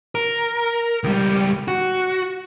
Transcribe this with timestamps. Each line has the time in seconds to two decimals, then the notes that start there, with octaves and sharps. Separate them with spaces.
0.15 A#4
1.04 C#2 G3
1.68 F#4